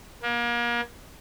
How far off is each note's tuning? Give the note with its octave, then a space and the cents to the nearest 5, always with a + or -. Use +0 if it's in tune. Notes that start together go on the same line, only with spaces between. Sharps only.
A#3 +35